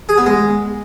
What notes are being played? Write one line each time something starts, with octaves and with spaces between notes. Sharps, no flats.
G#4
B3
G#3